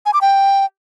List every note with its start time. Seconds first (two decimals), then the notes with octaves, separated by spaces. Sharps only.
0.06 G#5
0.14 D6
0.21 G5